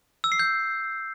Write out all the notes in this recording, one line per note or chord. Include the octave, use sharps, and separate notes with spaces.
E6
C7
G6